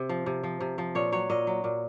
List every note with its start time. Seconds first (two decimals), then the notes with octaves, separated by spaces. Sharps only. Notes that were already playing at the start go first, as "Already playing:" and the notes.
Already playing: C3
0.09 F3
0.26 C3
0.43 F3
0.61 C3
0.78 F3
0.95 A#2 C#5
1.12 F#3 C#5
1.30 A#2 D#5
1.47 F#3
1.64 A#2